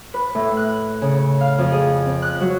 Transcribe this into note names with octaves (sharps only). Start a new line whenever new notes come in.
B4
A2
F#6
C#3
F5
F2
G#4
C4
F#6
F#3